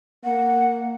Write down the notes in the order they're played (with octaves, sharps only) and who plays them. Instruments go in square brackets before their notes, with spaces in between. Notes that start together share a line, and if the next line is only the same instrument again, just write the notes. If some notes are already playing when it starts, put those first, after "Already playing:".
[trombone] A#3 [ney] F#5